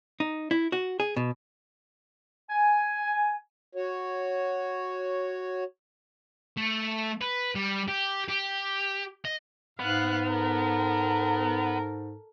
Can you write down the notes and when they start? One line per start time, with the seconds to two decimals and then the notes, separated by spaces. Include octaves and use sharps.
0.20 D#4
0.51 E4
0.72 F#4
1.00 G#4
1.17 B2
2.50 G#5
3.75 F#4 C#5
6.58 A3
7.22 B4
7.55 G3
7.88 G4
8.29 G4
9.25 D#5
9.79 G#2 B3 F5 F#6
10.29 A4 A#4